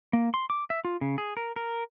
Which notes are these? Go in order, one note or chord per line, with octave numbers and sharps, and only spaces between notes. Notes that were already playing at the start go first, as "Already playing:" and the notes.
A#3
C6
D6
E5
F4
C#3
G#4
A#4
A#4